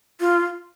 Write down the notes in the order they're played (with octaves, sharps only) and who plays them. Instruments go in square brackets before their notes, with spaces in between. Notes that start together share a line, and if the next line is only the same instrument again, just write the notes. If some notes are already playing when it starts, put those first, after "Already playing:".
[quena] F4